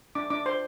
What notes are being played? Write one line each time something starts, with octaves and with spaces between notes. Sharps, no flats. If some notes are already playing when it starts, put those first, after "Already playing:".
D4 D6
D4 D6
C5 C6